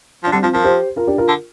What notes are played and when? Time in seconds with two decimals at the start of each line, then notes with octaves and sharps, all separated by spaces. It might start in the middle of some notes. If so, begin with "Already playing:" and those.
0.24 F3 D4
0.32 D3 G3 C4
0.43 F3 C4 F4
0.53 F3 F4 A#4
0.64 G4 C5
0.96 F4 A#4
1.07 D4 G4
1.18 F4 A#4
1.28 D3